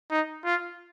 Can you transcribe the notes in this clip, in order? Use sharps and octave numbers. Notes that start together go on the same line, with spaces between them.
D#4
F4